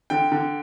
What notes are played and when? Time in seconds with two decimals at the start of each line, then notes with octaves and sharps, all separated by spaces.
0.10 D3 G5
0.32 D3